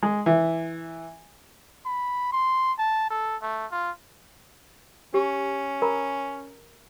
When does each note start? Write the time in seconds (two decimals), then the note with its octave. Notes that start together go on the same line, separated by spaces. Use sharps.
0.03 G#3
0.26 E3
1.85 B5
2.32 C6
2.78 A5
3.10 A4
3.42 A3
3.71 F4
5.14 C#4 G4
5.82 A#4 A#5 B5